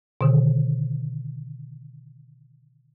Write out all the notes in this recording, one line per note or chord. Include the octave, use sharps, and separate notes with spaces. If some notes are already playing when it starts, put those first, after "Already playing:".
B2 D3 D#3